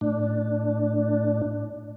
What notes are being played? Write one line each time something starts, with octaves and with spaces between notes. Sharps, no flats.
A2 D4